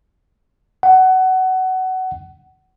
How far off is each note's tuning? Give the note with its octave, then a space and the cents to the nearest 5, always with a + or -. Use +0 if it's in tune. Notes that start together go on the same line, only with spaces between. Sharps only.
F#5 +20